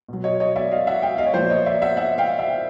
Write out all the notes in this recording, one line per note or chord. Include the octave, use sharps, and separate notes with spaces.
B2 F#3
C#5 D#5
C#5 D#5
D5 E5
D#5 F5
E5 F#5
F5 G5
D#5 F5
C#5
A#2 F3 C5 D5
C#5 D#5
D5 E5
E5 F#5
E5 F#5
F5 G5
E5 F#5